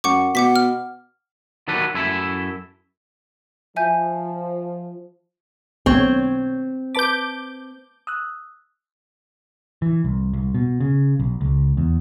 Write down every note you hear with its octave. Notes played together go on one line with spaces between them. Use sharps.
F#2 F#5 C#6 D6
B2 F#5 D6 B6
F6
D#3 F#3 D4 A4 B4
F#2 E4 A4 E5
F3 E5 G#5 G6
B1 D#3 B3 C4 D4 C#5
B4 A5 D6 G6 B6
D#6 E6 F#6
E3
C2
C2
B2
C#3
B1
C#2
E2